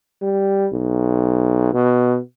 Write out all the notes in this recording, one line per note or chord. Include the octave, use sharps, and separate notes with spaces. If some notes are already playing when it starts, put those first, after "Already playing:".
G3
B1
B2